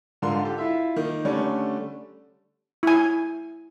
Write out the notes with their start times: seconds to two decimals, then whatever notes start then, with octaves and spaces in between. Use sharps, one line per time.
0.22 G#2 D3 F4 A#4 C6
0.43 G4 A4
0.58 E4 F4 E5
0.96 D#3 A#3 D#4
1.25 D3 G3 A3 C#4 D4
2.83 E4 G#5